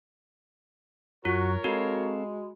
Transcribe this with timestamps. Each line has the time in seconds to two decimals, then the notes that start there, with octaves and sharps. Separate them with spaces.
1.25 F#2 F4 F#4 A#4 C#5
1.64 G#3 C4 F#4 A4 F5